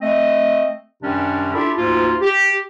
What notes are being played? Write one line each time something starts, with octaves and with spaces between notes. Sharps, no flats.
A3 C4 D#5
F#2 C3 D#3 G3 C#4 D4
D4 E4 F4 G4 A4
D2 G#2 A#3 F4
G4